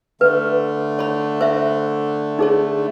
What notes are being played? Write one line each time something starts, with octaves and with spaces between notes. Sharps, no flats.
D3 A3 B4
C#5 B5
C5 E5
D#4 G#4 C#5